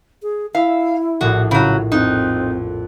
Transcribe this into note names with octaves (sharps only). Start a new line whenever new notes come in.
G#4
E4 E5 F5 E6
A#1 A2 F#4 G#4
C#3 F#3 E4
F2 C4 D#4 F#6